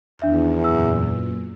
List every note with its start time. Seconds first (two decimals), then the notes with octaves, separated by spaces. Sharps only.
0.22 E2 D#3 D4 E5
0.64 F#2 A#2 E6